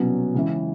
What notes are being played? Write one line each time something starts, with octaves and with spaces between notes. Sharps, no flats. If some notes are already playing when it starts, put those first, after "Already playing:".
Already playing: C2 B2 F#3 B3 C#4
C#2 C#3 E3